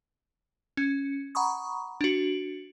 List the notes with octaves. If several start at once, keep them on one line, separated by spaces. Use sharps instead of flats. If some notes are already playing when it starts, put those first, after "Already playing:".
C#4
F#5 A#5 B5 C#6 D#6
D4 F#4